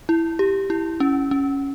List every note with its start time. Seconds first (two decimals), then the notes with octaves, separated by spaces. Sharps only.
0.09 E4
0.39 G4
0.70 E4
1.00 C#4
1.31 C#4